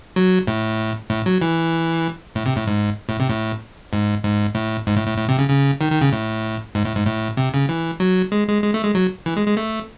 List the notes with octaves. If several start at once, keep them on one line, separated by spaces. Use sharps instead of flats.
F#3
A2
A2
F#3
E3
A2
C3
A2
G#2
A2
C3
A2
G#2
G#2
A2
G#2
A2
A2
A2
C3
C#3
C#3
D#3
D#3
C#3
A2
G#2
A2
G#2
A2
C3
C#3
E3
F#3
G#3
G#3
G#3
A3
G#3
F#3
E3
G#3
G#3
A3